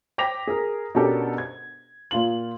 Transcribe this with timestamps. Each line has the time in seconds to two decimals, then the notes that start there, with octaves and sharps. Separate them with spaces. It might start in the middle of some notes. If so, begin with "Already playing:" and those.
0.18 G5 D6 A#6 B6 F7
0.47 G#4 A#4
0.95 B2 C#4 D4 G4 A4 A#4
1.38 G#6
2.11 A#2 F4 F#7